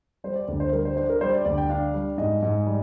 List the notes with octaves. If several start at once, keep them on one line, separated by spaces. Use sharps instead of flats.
G3 C5
D5
D2
C5
G3 A#4
C5
D4 C5
A#4
G3 C5
D5
D2 D5
G5
D4 F5
G3
G#2 D#5
G#2
G3